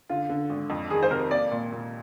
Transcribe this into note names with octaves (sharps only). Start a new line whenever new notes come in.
D3 F4
D3
G#1
F2
D#3 G#4
C5
C3 A#4
A#3 D5
A#2
A#2